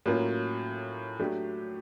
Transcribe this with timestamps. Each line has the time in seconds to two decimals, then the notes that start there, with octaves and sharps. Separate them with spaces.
0.06 A2 F#3 A#3 C#4 F4
1.19 F#3 A3 D4 G4